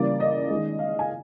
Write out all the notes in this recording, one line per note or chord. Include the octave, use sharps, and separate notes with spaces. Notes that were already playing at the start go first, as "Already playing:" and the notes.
Already playing: C#3 E3 G3 A#3 D5
D#5
D#3 G#3
F5
G#5